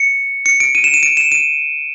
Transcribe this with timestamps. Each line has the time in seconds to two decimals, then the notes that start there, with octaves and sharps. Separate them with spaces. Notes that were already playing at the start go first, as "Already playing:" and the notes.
Already playing: C#7
0.46 C#7
0.60 D7
0.75 D#7
0.84 E7
0.94 D#7
1.03 D7
1.17 E7
1.32 D#7